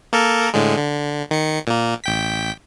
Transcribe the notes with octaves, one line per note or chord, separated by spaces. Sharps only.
A#3 A4 A#4
A2 D3 G#3
D3
D#3 C#7
A#2 A#3
A1 G5 B6